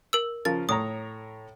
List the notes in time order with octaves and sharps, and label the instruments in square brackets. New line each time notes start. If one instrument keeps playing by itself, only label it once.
[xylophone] A#4 E6
[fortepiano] C#3 F3 A#4 [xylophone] A6
[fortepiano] A2 C#5 A#5 [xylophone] D#6